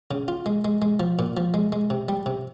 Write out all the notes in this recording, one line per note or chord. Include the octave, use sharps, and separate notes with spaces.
C#3
F4
G#3
G#3
G#3
F3
A#2
F3
G#3
G#3
C3
G3
C3